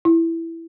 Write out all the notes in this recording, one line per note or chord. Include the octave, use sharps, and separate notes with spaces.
E4